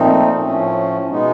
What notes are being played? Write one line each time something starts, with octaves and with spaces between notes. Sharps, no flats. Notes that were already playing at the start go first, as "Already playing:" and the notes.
Already playing: A#2 F3 A3 C4 D#4
A2 F3 A3 C#4
B2 G#3 B3 D#4